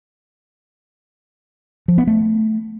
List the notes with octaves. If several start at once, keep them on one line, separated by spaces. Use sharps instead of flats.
F3
B3
A3